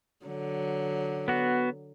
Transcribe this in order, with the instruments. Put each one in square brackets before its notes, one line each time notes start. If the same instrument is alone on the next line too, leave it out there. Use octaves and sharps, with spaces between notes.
[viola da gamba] D3 F#3
[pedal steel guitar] B3 F#4